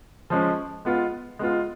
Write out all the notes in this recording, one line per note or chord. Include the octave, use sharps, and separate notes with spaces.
F3 G#3 C#4
G#3 B3 F4
G#3 B3 F4